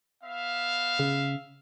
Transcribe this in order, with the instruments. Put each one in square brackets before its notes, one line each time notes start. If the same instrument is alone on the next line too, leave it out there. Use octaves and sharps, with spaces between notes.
[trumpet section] B3 E5 F5
[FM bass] C#3